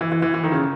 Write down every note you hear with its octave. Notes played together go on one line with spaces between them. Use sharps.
E3
E3
E3
E3
D#3
C#3